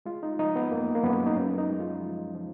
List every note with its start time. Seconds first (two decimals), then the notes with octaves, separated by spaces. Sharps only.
0.06 G#3 F4
0.23 D#4
0.39 F3 D#4
0.56 B3
0.71 F#2 A#3
0.95 A#3
1.03 F#2 B3
1.26 D#4
1.36 F#2 C#4
1.58 D#4
1.70 G#3
1.80 F4
2.01 F3
2.35 F3